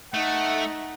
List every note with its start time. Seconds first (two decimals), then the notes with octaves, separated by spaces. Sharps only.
0.14 A3 D#4 F#5